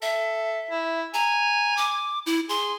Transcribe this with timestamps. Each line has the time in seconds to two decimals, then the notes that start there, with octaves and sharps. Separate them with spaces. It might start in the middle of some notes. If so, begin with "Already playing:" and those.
0.02 A4 E5
0.71 E4
1.14 G#5 A#5
1.77 D6
2.26 E4
2.49 G#4 C6